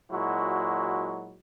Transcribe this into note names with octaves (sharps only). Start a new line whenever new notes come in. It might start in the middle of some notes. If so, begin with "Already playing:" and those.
A#2 F#3 G#3 E4 F#4